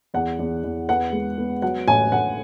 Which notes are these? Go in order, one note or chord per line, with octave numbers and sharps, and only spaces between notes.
E2 F#5
E2
E2
B3 F#5
G#3
B3
F#3 F#5
A1 G#5
A1 F#5